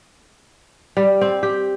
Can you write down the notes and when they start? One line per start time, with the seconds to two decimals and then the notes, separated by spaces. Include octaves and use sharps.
0.97 G3
1.21 C4
1.43 G4